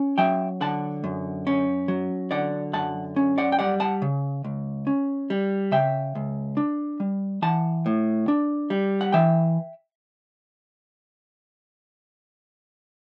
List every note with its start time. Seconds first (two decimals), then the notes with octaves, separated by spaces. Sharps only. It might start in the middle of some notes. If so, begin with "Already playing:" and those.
Already playing: C#4
0.18 F#3 E5 G5
0.61 D3 F#5 A5
1.04 F#2
1.47 C#4
1.88 F#3
2.31 D3 D5 F#5
2.73 F#2 F#5 A5
3.16 C#4
3.38 D5 F#5
3.52 G5
3.59 G3 D5 F#5
3.80 F#5 A5
4.02 C#3
4.44 C#2
4.87 C#4
5.30 G3
5.72 C#3 E5 G5
6.15 C#2
6.57 D4
7.00 G3
7.42 E3 F#5 A5
7.86 A2
8.28 D4
8.70 G3
9.01 F#5
9.12 E3 E5 G5